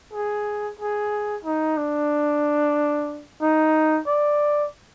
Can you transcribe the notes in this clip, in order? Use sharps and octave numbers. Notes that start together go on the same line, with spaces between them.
G#4
G#4
D#4
D4
D#4
D5